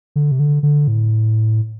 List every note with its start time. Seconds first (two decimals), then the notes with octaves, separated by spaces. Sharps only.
0.16 D3
0.32 C3
0.40 D3
0.63 D3
0.88 A2